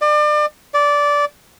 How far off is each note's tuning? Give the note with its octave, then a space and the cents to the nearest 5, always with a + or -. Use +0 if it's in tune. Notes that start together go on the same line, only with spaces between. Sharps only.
D5 +35
D5 -15